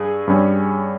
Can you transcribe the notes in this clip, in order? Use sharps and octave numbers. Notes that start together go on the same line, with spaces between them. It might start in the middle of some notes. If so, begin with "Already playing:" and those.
Already playing: G2 G#4
G2 G3 C#4